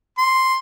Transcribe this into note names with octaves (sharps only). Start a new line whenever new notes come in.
C6